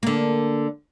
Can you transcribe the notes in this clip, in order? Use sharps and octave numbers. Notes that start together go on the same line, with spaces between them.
D3 A#3